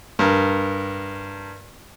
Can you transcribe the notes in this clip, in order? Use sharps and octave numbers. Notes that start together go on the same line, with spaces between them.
G2 A#4